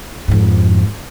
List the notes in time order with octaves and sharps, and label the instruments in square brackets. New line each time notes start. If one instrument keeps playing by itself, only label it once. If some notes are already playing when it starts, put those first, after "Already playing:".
[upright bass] F2 G#2